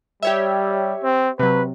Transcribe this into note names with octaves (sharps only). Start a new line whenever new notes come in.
G3 G4 C#5 E5
C4
C3 F#3 B4